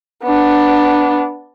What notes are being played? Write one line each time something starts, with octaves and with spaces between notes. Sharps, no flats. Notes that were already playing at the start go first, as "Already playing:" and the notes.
B3 D4